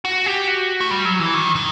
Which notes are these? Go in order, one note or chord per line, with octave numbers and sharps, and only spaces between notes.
F#4
G4
F#4
A3
G3
F#3
E3
D#3
D#3